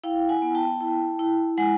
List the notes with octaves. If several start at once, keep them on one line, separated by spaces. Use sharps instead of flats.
E4 F5 G5
F#5 G#5
B3
G5 A5
E4
E4
G#3 F#5 G#5